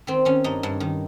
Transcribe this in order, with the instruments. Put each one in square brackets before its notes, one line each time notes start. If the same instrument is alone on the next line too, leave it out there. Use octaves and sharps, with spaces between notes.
[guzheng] D#3 C4
D#3 C#4
G2 D#4
G2
D#3